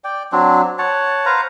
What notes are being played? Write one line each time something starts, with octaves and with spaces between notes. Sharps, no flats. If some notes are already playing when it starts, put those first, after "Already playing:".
D5 G5
F#3 C4 D4
C#5 F#5 A5
B4 C5 F5 A#5